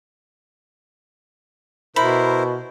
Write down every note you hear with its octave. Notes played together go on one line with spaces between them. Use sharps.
B2 E4 A#4 C5 B5